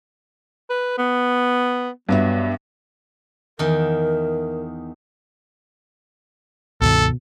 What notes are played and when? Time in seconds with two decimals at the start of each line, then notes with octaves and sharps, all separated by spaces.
0.70 B4
0.98 B3
2.09 G2 F#3 B3 E5
3.59 E2 D#3 A#4
6.82 C#2 G2 B2 D#3 A4